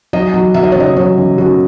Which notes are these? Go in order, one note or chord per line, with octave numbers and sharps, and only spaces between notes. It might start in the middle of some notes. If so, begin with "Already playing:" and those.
F#3 D#5
F#3
F#3 E5
D#5
C#5
C#3 D#5
F#3 C#5
C#3
C#3 F#4